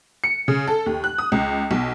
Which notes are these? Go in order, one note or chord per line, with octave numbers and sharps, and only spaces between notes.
C#7
C#3
A4
D#2
F#6
D#6
C#2
B1